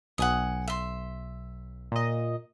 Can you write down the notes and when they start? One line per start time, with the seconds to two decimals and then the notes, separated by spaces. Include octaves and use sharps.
0.18 B1 F#5 G#5 D#6
0.68 E5 C6
1.92 A#2 D#5